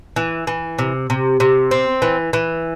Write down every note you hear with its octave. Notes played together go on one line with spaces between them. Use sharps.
E3
E3
C3
C3
C3
C4
E3
E3